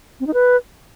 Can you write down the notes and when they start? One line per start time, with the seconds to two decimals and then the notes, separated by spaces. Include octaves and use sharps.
0.20 C4
0.27 D#4
0.34 B4